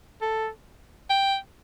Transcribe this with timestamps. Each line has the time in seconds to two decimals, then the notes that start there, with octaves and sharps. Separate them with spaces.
0.21 A4
1.10 G5